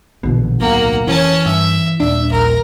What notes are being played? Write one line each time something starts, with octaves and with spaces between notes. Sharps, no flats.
A#1 B2 D3 E3
D1 B1 A#3 F#5
F1 E3 C#4 A5
G2 E5
D#1 D4 E5
A#1 A#4